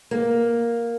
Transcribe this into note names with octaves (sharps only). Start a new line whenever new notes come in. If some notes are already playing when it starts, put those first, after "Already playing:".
A#3